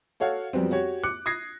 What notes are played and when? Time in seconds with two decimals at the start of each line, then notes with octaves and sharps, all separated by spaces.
0.20 F#4 A4 C#5 F5 F#5
0.53 F2 F#3 G3 B3 C4
0.71 F#4 G4 C#5
1.03 D6 F#6 C#7
1.26 D#6 G#6 A#6 C7